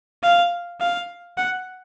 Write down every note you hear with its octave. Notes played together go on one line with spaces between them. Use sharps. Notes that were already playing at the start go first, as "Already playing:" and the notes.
F5
F5
F#5